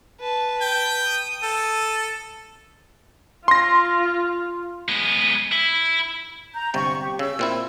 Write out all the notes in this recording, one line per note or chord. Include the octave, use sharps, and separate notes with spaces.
B4 A5
G5
D#6
A4
F4 C6 A#6
G#3 B3
E4
A#5 G6
G1 C3 G5 C#6
G4
C#3 E6
A#2 C4 E4